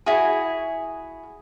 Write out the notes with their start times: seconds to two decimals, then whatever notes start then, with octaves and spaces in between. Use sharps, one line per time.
0.06 E4 F#4 G#4